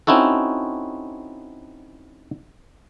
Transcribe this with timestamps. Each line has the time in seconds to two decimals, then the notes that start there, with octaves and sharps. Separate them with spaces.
0.07 C4 C#4 D#4 E4 F#4 A4